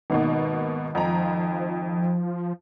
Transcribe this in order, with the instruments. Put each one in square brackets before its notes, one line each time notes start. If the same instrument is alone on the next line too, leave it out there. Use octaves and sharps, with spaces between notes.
[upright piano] G#1 [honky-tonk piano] B2 A#3 B3
[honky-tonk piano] F2 A#5 [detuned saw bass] F3